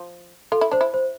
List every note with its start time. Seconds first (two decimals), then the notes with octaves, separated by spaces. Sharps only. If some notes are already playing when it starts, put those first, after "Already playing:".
Already playing: F3
0.52 F4 A4
0.61 E4
0.71 D4 C5
0.81 E4
0.94 C5